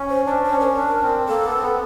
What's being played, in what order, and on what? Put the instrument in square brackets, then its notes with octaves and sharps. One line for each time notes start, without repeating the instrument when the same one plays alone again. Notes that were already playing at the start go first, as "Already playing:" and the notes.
Already playing: [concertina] C#4
[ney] C5
[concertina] D4 [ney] C5
[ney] C5
[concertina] C#4
[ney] A#4
[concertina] D4
C4
[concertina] A#3 [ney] A4
[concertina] B3
C4
B3